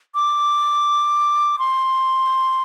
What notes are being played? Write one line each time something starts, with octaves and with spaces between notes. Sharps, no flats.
D6
C6